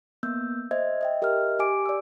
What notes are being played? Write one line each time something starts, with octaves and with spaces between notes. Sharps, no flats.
A#3 B3 E6 G6
C5 D#5 E5 G#6
D#5 E5 G5
G4 A#4 D#5 E5 F6
G4 G#5 D6 D7
D5 E6